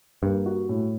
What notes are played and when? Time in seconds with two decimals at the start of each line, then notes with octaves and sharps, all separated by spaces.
0.22 G2 A#3
0.46 F#4
0.69 A2